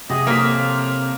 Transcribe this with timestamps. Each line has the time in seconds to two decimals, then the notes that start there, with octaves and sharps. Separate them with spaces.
0.10 C3 F#4 G#4 D#5
0.27 A2 F3 A#3 F6 B6